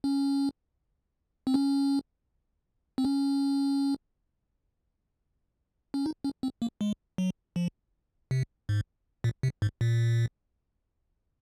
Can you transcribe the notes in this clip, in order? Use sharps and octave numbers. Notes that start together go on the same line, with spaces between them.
C#4
C4
C#4
C4
C#4
C#4
D#4
C#4
C4
A#3
G#3
F#3
F3
C3
G#2
A#2
C3
G#2
A#2